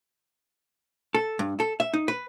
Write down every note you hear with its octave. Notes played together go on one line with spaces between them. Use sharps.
A4
G2
A4
E5
D#4
B4